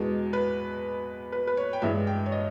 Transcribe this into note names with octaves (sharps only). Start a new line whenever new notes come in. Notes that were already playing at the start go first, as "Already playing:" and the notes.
Already playing: E2 B2 G#3
B4
B4
B4
C#5
G5
G2 E3 G#3 E5
G5
C#5
D#5